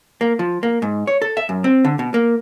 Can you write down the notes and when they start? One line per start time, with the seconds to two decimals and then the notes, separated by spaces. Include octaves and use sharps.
0.21 A#3
0.39 F3
0.63 A#3
0.82 G#2
1.07 C#5
1.22 A4
1.37 E5
1.49 F#2
1.64 C4
1.85 D3
1.99 B2
2.14 A#3